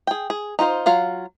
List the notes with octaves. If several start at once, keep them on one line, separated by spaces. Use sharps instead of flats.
G#4 G5
G#4
D#4 F4 F#4 C5
F#3 F4 F5